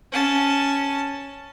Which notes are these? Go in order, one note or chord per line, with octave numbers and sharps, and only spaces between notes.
C#4 A5